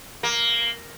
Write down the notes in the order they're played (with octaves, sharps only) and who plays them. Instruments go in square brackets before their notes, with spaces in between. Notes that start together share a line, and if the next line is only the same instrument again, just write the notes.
[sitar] A#3